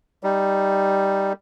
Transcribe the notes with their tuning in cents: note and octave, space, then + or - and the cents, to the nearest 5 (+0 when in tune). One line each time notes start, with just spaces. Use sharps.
G3 +0 D#4 +0